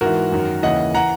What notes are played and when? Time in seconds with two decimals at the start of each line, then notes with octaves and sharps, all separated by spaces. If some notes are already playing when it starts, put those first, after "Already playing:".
0.01 G#2 E3 F#4 A#4
0.32 F#2 D#3
0.63 D#2 C#3 E3 D#5 F#5
0.94 E3 F#5 A#5